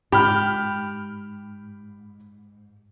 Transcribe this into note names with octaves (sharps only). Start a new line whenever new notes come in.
G#2 G4 B5 F6